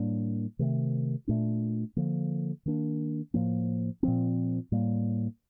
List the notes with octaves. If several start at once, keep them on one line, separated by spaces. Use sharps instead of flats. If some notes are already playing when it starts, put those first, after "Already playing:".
Already playing: A2 G3 A#3 D4
C3 D#3 A3
A#2 A3 D4
D3 F3 A#3
D#3 A#3 D4
A2 F3 A#3
A#2 F3 C4
A2 G3 A#3